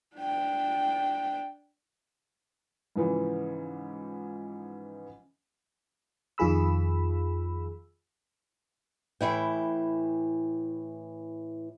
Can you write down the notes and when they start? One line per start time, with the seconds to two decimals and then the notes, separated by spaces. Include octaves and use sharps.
0.16 D4 G5
2.96 G#2 C#3 E3 F3
6.38 F2 D#3 F4 G#4 B5 E6
9.21 A2 E3 E4 G5